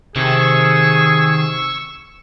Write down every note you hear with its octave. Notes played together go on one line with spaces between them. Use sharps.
C3 D#3 G#4 C#6 E6